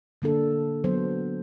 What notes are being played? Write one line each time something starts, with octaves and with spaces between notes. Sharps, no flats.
D3 A#3 D4 A4
F#3 B3 C5